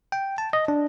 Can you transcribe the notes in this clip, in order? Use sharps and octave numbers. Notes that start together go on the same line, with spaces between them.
G5
A5
D#5
D4